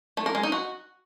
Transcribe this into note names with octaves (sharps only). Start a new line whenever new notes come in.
A3
A#4
G#3
D#4
F#4